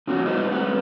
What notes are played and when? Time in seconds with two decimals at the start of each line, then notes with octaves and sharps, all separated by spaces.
0.07 C#3 F3 C4 C#4 F#4
0.26 G3 D#4 B4 C5 D#5
0.52 G3 C4 B4 F#5